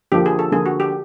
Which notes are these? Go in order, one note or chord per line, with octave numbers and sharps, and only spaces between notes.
D3 F3 A#3 G4
G#4
A4
D3 F3 A#3 G#4
F#4
G4